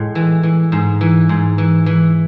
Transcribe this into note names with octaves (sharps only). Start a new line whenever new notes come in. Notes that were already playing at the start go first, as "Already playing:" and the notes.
Already playing: A2 G#3
E3
E3
G#2
E3
G#2
E3
E3